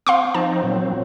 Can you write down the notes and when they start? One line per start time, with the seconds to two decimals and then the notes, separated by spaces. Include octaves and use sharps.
0.07 C4 F5 C6 C#6
0.34 F3 C4 D#4 A5
0.63 A#2 F#3 C4